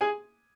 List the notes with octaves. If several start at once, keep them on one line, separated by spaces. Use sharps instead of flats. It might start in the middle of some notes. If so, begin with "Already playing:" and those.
G#4 G#5